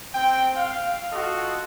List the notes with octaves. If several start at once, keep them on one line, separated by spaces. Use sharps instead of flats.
C4 G5
F5
F4 F#4 A4 D#5